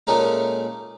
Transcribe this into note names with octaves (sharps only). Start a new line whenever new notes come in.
A#2 G#3 A3 C#4 D#4